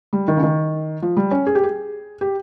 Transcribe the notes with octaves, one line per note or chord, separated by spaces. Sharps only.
G3
D#3
C#3
D#3
F3
G3
C#4
G#4
G4
G#4
G4